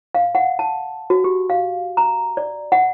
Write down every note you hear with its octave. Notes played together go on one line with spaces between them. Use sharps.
F5
F#5
A5
F#4
G4
F5
A#5
D5
F#5